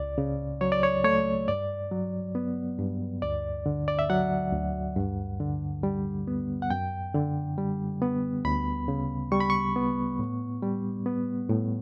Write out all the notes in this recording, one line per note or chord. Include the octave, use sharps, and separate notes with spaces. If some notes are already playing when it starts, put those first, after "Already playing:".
Already playing: C#2 D5
C#3
F#3 C#5
D5
C#5
A3 C#5
G2 D5
F#3
B3
G2
D2 D5
D3
D5
E5
F#3 F#5
D2
G2
D3
G3
B3
F#5
F#2 G5
D3
G3
B3
D2 B5
C#3
G3 C#6
B5
C#6
B3
A2
G3
B3
A2